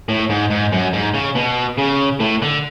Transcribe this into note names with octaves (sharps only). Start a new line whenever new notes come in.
A2
G#2
G#2
F#2
G#2
C#3
B2
C#3
A2
D3